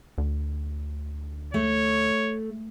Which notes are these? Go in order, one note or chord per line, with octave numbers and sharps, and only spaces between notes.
D2
A3 C#5